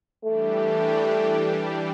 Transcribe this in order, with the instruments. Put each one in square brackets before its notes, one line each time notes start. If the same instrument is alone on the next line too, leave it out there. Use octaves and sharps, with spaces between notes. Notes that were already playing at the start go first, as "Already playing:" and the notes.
[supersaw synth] E3 G3 D4 G4 [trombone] A3